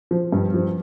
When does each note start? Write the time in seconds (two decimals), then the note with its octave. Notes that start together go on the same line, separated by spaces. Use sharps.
0.11 F3
0.32 G2
0.54 F3